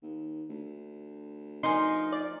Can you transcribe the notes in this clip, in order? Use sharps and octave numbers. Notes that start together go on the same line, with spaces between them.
D#2
D2
F3 D#4 A#4 G#5 C6
D5